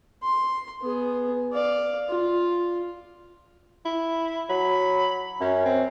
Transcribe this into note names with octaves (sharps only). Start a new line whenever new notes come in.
C6
B3 G#4
D5 F5
F4
E4
F#3 B5
F#2 C#4
C4